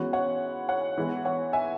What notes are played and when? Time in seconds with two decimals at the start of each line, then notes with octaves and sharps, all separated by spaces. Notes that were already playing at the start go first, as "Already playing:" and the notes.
Already playing: E3 G#3 B3 C#4 F#4
0.13 C#5 F#5
0.69 C#5 F#5
0.98 E3 G#3 B3
1.25 C#5 F#5
1.53 E5 G#5